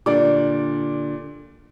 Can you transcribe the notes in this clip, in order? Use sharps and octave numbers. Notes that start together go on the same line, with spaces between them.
A#2 D3 D4 G4 D5 D6